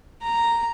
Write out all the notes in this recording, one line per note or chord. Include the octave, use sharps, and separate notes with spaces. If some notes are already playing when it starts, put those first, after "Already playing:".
A#5